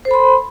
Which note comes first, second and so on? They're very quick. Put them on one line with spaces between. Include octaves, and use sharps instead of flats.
C5 A4 B5 C6